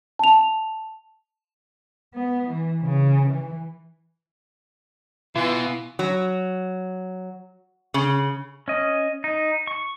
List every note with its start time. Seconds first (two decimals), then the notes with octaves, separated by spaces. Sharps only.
0.19 A5 F7
2.13 B3
2.47 E3
2.83 C#3
3.29 E3
5.35 B2 E3 F4
5.99 F#3
7.94 C#3
8.68 C#4 D#5
9.24 D#4
9.67 C#6